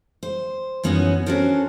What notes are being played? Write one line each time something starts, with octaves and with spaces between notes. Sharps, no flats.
C5
F#2 E3 B3 C#4 D#4 F#4
C#4 D4 F#4 A4 A#4 C5